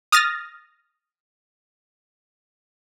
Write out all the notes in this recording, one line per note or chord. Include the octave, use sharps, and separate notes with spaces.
D#6 F6 A6 A#6